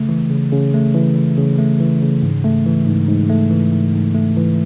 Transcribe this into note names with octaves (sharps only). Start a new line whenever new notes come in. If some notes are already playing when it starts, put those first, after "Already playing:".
Already playing: C#3 A3
E3
C#3
C#3
A3
E3
C#3
C#3
A3
E3
C#3
G#2
A3
E3
G#2
G#2
A3
E3
G#2
G#2
A3
E3